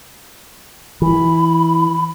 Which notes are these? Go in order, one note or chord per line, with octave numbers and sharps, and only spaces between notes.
E3 B5